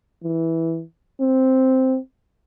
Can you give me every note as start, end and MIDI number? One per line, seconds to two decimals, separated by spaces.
0.24 0.83 52
1.20 1.98 60